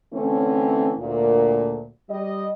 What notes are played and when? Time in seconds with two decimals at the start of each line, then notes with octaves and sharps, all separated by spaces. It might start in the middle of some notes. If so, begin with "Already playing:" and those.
0.14 D3 E3 A3 C4 C#4
0.98 D2 A#2
2.10 G3 D#5